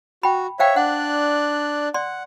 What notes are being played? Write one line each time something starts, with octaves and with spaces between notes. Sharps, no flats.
F#4 G5 B5
C5 C#5 E5 F5 G5
D4 D5 F#5 F#6
D5 F#5 C6